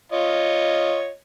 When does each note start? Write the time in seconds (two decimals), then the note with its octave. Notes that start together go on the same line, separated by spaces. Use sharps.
0.12 F4 C#5 D#5